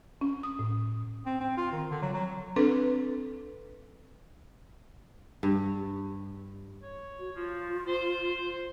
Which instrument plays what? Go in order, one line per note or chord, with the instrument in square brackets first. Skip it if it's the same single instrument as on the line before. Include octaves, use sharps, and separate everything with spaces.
[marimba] C#4
D#6
A2
[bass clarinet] C4
C4
F4
D#3
D3
F#3
F#3
[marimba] C4 D4 A4 B4
[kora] G2
[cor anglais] C#5
[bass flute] F#4
[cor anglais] F3 [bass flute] F4
[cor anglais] C5